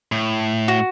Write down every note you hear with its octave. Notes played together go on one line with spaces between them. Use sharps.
A2
F#4